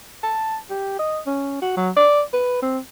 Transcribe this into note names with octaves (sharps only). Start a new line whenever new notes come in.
A5
G4
D#5
C#4
F#4
F#3
D5
B4
C4